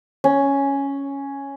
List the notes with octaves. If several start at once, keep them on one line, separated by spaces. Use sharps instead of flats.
C#4